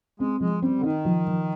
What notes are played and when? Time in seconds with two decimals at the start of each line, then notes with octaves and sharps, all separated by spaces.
0.20 G#3 C4
0.40 F3 G#3
0.62 G3 C4
0.79 D3
0.83 D#3 D#4
1.05 F3
1.27 F3